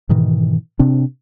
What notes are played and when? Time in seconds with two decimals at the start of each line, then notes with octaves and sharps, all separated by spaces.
0.09 G#2 B2 D#3 E3
0.79 C3 C4 D4